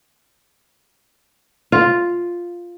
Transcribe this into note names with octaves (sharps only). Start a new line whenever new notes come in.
F4